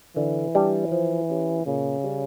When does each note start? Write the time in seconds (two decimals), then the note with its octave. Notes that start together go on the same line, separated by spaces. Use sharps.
0.16 D3 E3
0.55 G3 D4 G4
0.91 F3
1.30 C#4 G4
1.66 A#2 C#3
2.04 G3 C#4